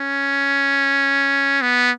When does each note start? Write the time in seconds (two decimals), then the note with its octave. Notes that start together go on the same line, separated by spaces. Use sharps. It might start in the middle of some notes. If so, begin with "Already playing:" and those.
Already playing: C#4
1.62 B3